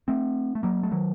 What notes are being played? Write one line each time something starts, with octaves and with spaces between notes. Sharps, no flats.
A3 C4
A3
F#3 A#3
A3
D#3 F#3